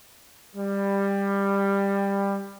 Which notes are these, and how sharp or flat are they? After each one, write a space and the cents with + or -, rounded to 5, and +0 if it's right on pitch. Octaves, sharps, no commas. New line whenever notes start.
G3 +15